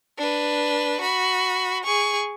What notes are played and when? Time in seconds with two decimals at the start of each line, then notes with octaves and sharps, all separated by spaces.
0.18 D4 B4
1.01 F#4 B5
1.84 G#4 C#6